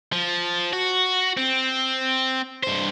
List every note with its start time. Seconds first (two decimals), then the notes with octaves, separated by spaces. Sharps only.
0.12 F3
0.73 F#4
1.37 C4
2.63 G2 C5